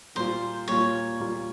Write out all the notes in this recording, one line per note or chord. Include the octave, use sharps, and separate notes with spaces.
A#2 G3 A#3 F4 C5
A#2 G3 A#3 F4 C#5
A#2 G3 A#3 F4